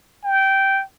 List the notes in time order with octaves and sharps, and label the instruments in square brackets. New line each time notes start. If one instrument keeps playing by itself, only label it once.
[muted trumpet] G5